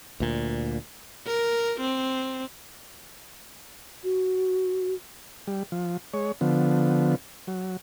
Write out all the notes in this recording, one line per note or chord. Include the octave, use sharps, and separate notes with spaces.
D2 A#2
A#4
C4
F#4
G3
F3
G#3 C#5
D3 F3 B3
F#3